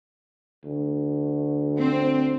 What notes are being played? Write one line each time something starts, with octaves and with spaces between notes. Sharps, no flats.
D2
C4